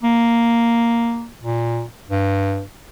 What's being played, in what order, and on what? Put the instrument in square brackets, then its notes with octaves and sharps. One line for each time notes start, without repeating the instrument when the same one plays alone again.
[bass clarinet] A#3
A#2
G2